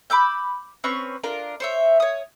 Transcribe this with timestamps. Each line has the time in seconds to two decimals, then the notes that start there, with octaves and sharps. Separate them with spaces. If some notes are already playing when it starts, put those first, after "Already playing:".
0.10 B5 D6 E6 G6
0.84 C4 C#4 B4 C#6
1.23 D4 F4 A#4
1.60 C5 C#5 E5
2.00 C#5 D#6